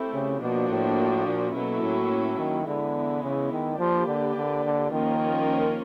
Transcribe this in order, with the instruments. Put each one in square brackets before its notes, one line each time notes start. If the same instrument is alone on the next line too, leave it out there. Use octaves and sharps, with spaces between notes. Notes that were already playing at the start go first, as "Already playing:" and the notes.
Already playing: [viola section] A3 C4 E4 G4
[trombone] C#3
[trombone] B2 [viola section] F3 A#3 D4 F#4
[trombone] A2
A#2
[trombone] B2 [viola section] F#3 A#3 C#4 E4 A4
[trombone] A2
D#3
[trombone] D3 [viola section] E3 G#3 B3 E4
[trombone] C#3
D#3
[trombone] F3 [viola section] A#3 D4 G4 B4 D5
[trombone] D3
D3
D3
[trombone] D#3 [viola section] F3 A#3 C#4 F4 A#4